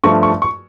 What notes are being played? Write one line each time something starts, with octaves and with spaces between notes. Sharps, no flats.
G2 F3 A3 C#6
C#6
C#6